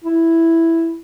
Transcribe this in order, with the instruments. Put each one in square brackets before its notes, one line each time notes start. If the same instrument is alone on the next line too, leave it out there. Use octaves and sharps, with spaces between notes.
[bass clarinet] E4